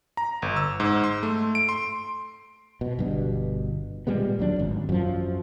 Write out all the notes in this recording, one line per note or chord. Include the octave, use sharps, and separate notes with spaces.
A#5
G1
E6
G#2
C6
A3
D7
C6
B2
G1 G2 B2
A#2 G3 G#3 B3
D#2 F#3 D4
G#1
F#2 F3